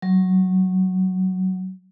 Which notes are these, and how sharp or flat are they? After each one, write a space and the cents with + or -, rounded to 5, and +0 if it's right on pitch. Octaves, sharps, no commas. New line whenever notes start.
F#3 +10